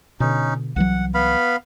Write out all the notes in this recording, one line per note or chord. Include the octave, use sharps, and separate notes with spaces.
B2 D3 C#4 D#4
C2 E3 F#3 F#5
B3 F5 B5